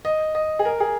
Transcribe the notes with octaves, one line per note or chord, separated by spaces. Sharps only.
D#5
D#5
G#4
A#4
G#4